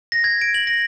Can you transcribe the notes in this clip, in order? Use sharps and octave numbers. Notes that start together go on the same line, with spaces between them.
A#6
G#6
D7
F#7
A#6